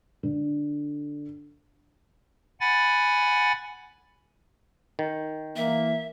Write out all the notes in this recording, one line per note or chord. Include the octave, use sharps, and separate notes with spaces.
D3
F#5 G#5 B5 A6
D#3
E3 A#3 E5